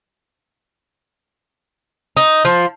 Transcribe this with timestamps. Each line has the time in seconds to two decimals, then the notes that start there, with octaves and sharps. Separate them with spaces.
2.17 D#4
2.45 F3